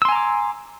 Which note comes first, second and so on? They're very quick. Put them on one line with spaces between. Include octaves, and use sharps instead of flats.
E6 C6 G#5 A#5 D6